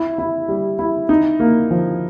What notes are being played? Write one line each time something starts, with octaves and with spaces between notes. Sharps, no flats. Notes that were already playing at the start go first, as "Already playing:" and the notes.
Already playing: E4
E4
G3
E4
D#4
A#3
F3